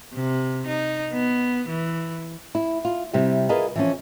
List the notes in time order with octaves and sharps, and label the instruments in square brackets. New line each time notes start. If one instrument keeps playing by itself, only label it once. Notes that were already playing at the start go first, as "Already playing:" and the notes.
[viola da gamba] C3
D#4
B3
E3
[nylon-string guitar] E4
F4
C3 G3 E4 E5
E4 F4 G#4 A#4 B4 D#5
E3 F3 C#4